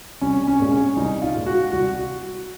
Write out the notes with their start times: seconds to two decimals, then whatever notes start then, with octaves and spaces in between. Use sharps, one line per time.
0.21 C2 C#4
0.47 C#4
0.59 A#2 G#3
0.72 C#4
0.96 C2 D#4
1.22 F4
1.35 A#2 G#3
1.46 F#4
1.72 C2 F#4